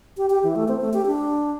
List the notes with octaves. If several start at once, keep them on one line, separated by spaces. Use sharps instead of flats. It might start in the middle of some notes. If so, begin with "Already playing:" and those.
G4
G4
E3
A3
C4
A3
G4
D4